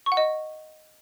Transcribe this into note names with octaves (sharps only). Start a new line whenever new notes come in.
C#6
F#5
D#5